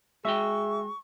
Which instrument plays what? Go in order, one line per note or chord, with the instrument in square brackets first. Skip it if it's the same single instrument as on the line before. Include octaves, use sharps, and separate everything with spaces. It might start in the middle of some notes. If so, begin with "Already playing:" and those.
[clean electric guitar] G#3 F#4 G5 [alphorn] G#4 [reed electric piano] E5 E6 [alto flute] C#6